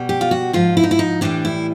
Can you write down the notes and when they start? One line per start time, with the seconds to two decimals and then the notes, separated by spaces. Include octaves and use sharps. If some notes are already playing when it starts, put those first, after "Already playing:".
Already playing: B2 G3
0.09 G4
0.21 F4
0.31 F#4
0.53 G#2 F3 F4
0.77 E4
0.83 D#4
0.91 E4
0.99 D#4
1.21 A2 E3 G3 D4
1.45 E4